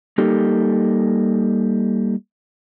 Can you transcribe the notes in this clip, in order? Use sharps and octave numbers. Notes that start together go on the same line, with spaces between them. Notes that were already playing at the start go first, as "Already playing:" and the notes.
G3 A#3 D#4 G4 A4